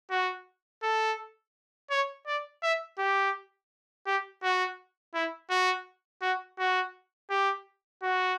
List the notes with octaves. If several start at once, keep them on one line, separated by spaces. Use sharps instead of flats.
F#4
A4
C#5
D5
E5
G4
G4
F#4
E4
F#4
F#4
F#4
G4
F#4